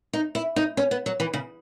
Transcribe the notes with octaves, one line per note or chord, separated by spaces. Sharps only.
D#4
E4
D#4
C#4
B3
F#3
E3
C#3